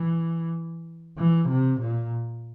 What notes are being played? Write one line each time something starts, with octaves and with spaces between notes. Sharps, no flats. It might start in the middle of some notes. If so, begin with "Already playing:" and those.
Already playing: E3
E3
C3
A#2